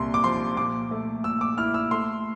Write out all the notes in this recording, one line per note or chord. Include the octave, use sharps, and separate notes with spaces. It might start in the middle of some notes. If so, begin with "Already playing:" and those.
Already playing: C2 A#2 A#3 C6
D6
F3 C6
A#2 D6
A3
A#2 E6
D6
E4 F6
E6
A3 C6